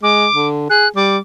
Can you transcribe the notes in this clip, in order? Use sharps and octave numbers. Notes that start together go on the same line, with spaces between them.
G#3 D6
D3
G#4 F#6
G3 D6